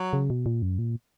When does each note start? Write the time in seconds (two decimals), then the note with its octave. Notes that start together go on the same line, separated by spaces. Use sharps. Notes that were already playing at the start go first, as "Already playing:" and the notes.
Already playing: F#3
0.13 C#3
0.30 B2
0.46 A#2
0.62 F#2
0.79 A#2